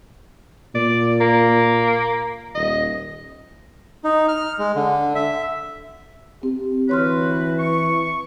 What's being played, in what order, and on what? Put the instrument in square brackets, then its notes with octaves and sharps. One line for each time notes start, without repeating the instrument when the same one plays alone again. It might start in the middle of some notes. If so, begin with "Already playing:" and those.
[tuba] A#2 [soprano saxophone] D5
[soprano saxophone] A#3
[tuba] D#1 [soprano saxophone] D#5
[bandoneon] D#4
F6
G#3
D3
E5
[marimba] C4 [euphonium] G4
[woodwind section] D3 F#4 B4 [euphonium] E3 [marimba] C#5 C6 F6
[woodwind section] C#6